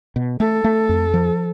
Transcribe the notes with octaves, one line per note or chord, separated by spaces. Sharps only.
B2
A3 A4
A3
F2
F3